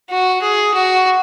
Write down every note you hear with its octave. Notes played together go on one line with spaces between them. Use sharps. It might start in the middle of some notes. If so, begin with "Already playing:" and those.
F#4
G#4
F#4